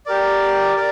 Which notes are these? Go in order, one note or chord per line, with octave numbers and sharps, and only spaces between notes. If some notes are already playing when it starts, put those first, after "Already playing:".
G4 A#4 D5
A#4 D5